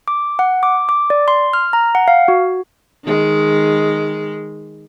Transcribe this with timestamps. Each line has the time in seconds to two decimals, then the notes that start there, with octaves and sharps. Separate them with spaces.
0.08 D6
0.39 F#5
0.63 D6
0.89 D6
1.10 D5
1.28 C6
1.53 F6
1.73 A#5
1.95 F#5
2.08 F5
2.28 F#4
3.04 D#3 G#3